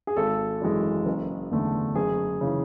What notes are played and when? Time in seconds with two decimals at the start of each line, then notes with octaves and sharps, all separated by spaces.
0.07 G#4
0.17 G#1 A4
0.61 F#2 E3 G#3
1.06 F#1
1.51 E2 D3 A3
1.95 F#1 G#4
2.41 C#3 E3